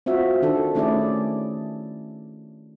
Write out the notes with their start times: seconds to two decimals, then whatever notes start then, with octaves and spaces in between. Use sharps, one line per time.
0.06 C4 F4 F#4 E5
0.42 D#3 D4 A4
0.75 D#3 A3 C#4 E4 G#4 D5